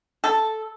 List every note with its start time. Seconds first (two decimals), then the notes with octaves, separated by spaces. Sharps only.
0.24 A4